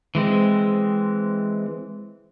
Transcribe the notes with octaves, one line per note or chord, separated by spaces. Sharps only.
E3 G#3 C4